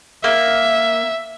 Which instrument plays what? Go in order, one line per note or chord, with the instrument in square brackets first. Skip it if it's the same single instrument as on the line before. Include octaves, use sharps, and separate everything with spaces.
[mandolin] A#3 [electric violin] E5